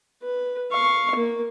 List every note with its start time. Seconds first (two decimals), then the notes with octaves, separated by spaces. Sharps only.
0.22 B4
0.71 F5 C#6
1.15 A#3